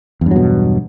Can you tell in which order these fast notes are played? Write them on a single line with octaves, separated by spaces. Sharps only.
E2 G2 F#3 B2